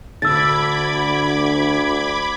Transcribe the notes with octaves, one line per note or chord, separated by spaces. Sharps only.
D2 D3 B5 D6 E6 G#6 A6